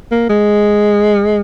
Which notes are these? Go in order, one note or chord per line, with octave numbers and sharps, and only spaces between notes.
A#3
G#3